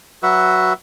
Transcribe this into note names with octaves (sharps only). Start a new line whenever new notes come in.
F#3 F#4 B4 E5